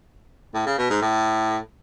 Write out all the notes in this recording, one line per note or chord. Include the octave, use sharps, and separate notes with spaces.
A2
C#3
B2
G#2
A2